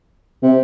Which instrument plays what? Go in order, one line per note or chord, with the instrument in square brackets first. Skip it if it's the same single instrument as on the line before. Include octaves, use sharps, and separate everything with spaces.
[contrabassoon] C3